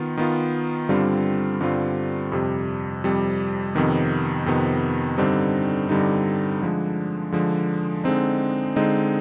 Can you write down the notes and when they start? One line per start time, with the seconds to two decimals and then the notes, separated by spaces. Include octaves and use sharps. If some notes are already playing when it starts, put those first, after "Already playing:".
Already playing: D#3 B3 F4
0.17 D#3 B3 F4
0.89 G2 D3 G3 C4 F4
1.61 G2 D3 G3 C4 F4
2.32 F2 C3 G3
3.04 F2 C3 G3
3.75 F2 C3 D#3 B3
4.46 F2 C3 D#3 B3
5.18 G2 D3 G3 C4 D#4
5.89 G2 D3 G3 C4 D#4
6.62 D3 F3 G#3
7.32 D3 F3 G#3
8.04 D3 G#3 C4 D#4
8.76 D3 G#3 C4 D#4